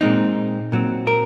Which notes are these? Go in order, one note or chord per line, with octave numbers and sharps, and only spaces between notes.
A#2 G#3 C4 D#4
A#2 F#3 C4
A#4